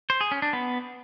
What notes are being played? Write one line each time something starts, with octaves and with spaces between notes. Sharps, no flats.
C5
G#4
C#4
D4
B3